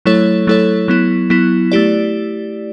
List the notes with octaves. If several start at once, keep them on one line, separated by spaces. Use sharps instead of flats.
F#3 A3 E4 A4 C#5
F#3 A3 E4 A4 C#5
F#3 B3 E4
F#3 B3 E4
A3 E4 G4 D5